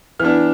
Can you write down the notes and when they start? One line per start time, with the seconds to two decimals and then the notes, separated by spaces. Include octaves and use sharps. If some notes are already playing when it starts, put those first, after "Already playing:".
0.20 E3 B3 D4 F6